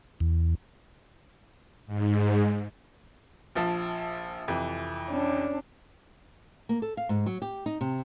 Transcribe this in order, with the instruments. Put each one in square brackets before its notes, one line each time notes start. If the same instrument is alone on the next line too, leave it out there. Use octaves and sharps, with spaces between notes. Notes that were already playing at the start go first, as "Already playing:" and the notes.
[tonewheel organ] E2
[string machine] G#2
[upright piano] A#1 F3 A5
F2 C3 E3
[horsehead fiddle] C#4 D4
[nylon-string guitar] A#3
A4
F5
G#2
F#3
G4
D#4
C3